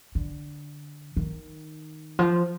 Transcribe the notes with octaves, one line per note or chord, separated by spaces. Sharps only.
D3
D#3
F3